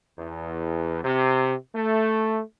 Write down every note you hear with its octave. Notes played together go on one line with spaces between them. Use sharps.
E2
C3
A3